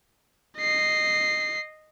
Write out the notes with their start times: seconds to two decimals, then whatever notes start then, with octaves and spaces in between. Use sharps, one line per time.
0.58 D#5 C7